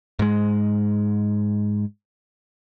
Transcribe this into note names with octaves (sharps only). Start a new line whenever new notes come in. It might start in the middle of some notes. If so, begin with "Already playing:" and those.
G#2 G#3